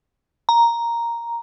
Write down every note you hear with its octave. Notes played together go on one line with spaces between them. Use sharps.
A#5